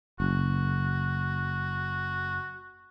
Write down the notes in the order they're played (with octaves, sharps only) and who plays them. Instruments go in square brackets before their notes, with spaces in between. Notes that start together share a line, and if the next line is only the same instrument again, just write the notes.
[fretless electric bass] F#1 [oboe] F#4